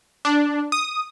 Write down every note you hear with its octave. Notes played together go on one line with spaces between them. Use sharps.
D4
D#6